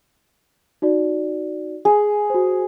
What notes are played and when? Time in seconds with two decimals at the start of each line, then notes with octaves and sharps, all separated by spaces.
0.82 D#4 F#4 D5
1.85 G#4
2.30 F#4 C5